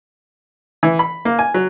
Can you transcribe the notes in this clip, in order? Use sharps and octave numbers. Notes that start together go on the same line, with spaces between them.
E3
B5
A#3
G#5
F#3